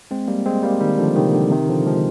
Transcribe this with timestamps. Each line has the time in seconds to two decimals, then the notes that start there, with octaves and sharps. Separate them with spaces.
0.11 G#3 C4
0.28 G3 A#3
0.45 G#3 C4
0.63 G3 A#3
0.80 D#3 G3
0.98 D3 F3
1.15 C3 D#3
1.34 D3
1.51 C3 D#3
1.69 D3 F3
1.86 F3 G#3